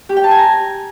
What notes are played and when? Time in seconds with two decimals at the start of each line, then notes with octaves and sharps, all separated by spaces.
0.09 G4
0.17 G5
0.24 A5
0.31 G#5
0.38 A#5